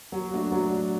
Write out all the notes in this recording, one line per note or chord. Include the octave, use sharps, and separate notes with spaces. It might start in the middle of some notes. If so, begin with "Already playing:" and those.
F#3
A3 D4 F#4
F#3